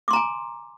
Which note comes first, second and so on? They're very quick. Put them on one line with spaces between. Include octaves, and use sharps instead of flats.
D6 C6 A#5 G#5